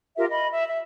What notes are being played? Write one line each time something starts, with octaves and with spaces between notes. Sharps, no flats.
F4 G4 A#4 E5
D#5 B5
E5
E5